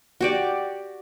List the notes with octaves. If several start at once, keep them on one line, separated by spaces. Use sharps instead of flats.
F#4 G4 D5